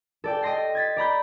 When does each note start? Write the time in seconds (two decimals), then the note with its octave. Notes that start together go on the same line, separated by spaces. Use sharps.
0.24 A4 D5 G5
0.42 D#5 G5 C6 A#6 C7
0.75 G#6 A6 B6
0.97 D5 A#5 B5 G6